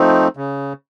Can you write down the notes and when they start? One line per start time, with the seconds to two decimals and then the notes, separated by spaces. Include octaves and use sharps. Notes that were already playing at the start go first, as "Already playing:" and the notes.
Already playing: F3 A3 C4 D#4
0.37 C#3